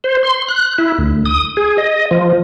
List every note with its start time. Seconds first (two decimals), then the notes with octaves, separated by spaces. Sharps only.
0.04 C5
0.23 C6
0.48 F#6
0.78 E4
0.98 D2
1.25 D#6
1.57 G#4
1.78 D#5
2.11 F3